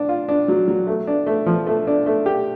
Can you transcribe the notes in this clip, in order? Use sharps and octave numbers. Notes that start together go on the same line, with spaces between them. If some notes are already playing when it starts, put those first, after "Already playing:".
Already playing: D4
F4
D4
F#3
F#3
A3
D4
A3
F3
A3
D4
A3
G4